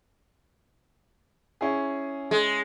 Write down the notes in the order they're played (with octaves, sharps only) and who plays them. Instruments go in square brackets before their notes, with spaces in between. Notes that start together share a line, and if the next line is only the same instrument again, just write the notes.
[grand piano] C#4 E4 G#4
[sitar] G#3